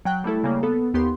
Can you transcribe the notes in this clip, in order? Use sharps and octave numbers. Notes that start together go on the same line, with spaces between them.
F#3 G5 F#6
G3 A3 E4 A4
C#3 G3 A#3
B3 A4
D#2 B3 G4 C6